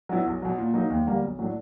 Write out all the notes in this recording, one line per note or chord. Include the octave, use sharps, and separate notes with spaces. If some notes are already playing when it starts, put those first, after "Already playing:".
F#3 B3 E4
B1
B2 F#3
A#2
F#3 A#3 D#4
D#2
D3 G3 A#3
B1
A2 F#3 A3 D4